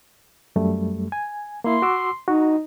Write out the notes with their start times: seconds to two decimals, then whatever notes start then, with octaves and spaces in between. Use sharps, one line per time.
0.56 F#2 G3 A3
1.12 G#5
1.64 A#3 E4 C6
1.82 F#4 D6 E6
2.28 D#4 F#4